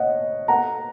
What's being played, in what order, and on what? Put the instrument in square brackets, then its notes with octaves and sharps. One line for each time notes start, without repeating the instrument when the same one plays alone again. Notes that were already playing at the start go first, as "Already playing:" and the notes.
Already playing: [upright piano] C#5 D#5 F#5
F#5 A#5